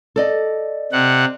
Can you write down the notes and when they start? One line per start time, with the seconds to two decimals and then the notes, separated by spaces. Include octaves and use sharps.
0.16 A4 D5 D#5
0.92 C3 F#5